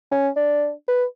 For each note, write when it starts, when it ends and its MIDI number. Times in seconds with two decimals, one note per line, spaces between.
0.11 0.28 61
0.36 0.71 62
0.88 1.05 71